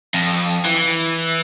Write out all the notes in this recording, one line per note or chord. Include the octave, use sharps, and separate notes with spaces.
F2
E3